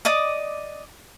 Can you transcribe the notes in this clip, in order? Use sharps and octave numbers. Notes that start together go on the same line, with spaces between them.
D5 D#5 D6 D#6